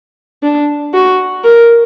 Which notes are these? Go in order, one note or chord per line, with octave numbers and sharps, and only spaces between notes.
D4
F#4
A#4